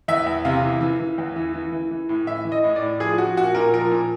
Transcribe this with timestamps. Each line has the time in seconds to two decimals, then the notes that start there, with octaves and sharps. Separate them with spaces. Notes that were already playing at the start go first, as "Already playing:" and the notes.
0.08 E2 E5
0.27 E2
0.45 C3 F5
0.63 E3
0.81 E3
1.00 E3
1.18 E2
1.36 E3
1.54 E3
1.72 E3
1.91 E3
2.09 A2
2.27 E3 E5
2.45 E3
2.52 D#5
2.64 A2
2.76 D5
2.82 A2
3.00 F3 G#4
3.18 F3 F#4
3.37 A#2 F#4
3.55 A#2 A#4
3.73 F3 A#4
3.91 A#2